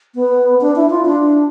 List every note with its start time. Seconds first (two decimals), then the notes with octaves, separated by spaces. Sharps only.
0.15 B3
0.61 D4
0.76 E4
0.90 F4
1.05 D4